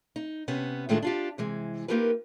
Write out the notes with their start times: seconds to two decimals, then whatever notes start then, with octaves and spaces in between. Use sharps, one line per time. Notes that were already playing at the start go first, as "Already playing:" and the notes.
0.16 D#4
0.48 C3 B3 C#4
0.89 A2 D#3 G#3 A3 D4 F4
1.03 D4 F4 G4
1.38 C3 E3 G#3
1.88 A#3 D#4 F4 G4 A#4 B4